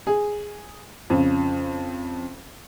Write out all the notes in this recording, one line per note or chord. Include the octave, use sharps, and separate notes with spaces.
G#4
F2 C#3